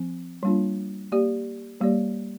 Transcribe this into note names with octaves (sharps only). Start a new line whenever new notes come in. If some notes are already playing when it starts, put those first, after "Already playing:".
Already playing: F3 C4
G3 A#3 D4 F4
A#3 G4 D5
G3 A#3 G4 D5